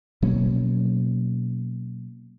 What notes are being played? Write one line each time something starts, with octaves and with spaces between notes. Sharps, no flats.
B2 F#3 A#3 C#4